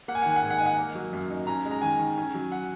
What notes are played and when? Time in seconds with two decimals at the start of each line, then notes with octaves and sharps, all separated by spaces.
0.08 A#3 F#5
0.15 G#5
0.22 F#5
0.26 D#3 G#5
0.36 F#5
0.42 G#2 G#5
0.50 F#5
0.58 D#4 G#5
0.66 F#5
0.78 A#3
0.95 F#3
1.13 F#2
1.30 D#4
1.47 C#4 A#5
1.65 G#3
1.71 A#5
1.82 D#3 G#5
1.99 D#3
2.17 C#4
2.34 F#3
2.52 F#5